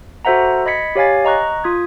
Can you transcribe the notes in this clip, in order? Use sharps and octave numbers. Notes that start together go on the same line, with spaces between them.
F#4 A4 C5 E5 F#5 A#5
D#5 B5 G#6 B6 C#7
G4 C#5 F5 G#5 A6
D#5 A#5 C#6 F#6
F4 D#6 G#6